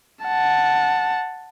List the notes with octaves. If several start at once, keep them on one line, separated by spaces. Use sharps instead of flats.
F#5 A5